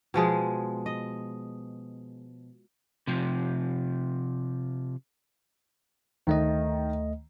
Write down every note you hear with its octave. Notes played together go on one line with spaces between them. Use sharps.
B2 F3 G#3 G#4
D#5
C3 F3
D2 D#3 A3 D#5